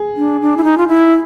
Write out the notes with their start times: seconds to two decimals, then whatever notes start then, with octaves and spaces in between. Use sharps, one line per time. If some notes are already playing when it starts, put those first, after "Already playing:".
Already playing: G#4
0.17 D4
0.41 D4
0.57 E4
0.64 D#4
0.78 F4
0.88 E4